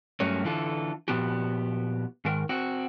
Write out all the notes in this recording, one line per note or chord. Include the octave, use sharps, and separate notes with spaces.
G2 F#3 A3 A#3 C#4
D3 E3 F4 A4
A#2 F3 B3 F#4 G4
G#2 D#3 A#4
C4 F#4